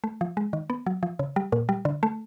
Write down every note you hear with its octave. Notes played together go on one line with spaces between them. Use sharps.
A3
F3
G#3
D#3
B3
F#3
F3
C#3
G3
A#2
G3
D3
A3